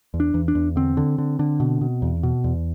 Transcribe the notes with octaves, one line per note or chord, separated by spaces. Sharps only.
E2
D4
E2
D4
E2
D3 C4
D3
D3
D3
B2
B2
E2
B2
E2